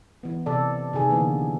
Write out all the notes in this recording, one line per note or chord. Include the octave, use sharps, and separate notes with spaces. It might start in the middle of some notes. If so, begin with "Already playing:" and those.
E3 B3
C3 A4 D5
C3 D#3 G#4 A4
D3 E3 A#3 B3